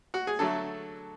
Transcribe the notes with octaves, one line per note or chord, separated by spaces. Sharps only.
F#4
G#4
D3 F#3 A3 A4